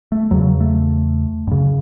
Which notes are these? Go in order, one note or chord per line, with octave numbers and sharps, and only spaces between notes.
A3
E2 C#3 F#3
A3
F#2 C#3